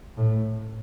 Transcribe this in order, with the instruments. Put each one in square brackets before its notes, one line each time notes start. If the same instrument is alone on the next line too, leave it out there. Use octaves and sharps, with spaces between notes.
[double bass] A2